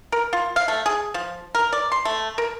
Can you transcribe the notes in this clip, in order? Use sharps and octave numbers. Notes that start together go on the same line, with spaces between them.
A#4
F4
F5
A3
G#4
F3
A#4
D5
C6
A3
A#4